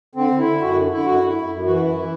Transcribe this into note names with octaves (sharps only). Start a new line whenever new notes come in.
D3 C4
D3
E4
D3
F#2 F#4
D3
D3 E4
F#2 F#4
F#2
E4
F#2
F#2
E3 F#4
F#4
F#2 E4
E3